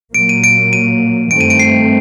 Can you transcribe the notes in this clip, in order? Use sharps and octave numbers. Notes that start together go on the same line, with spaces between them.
A#2 F#3 A#3 D7
D#7
D7
D#7
G2 D#3 A3 C4 D7
D#7
D7
C7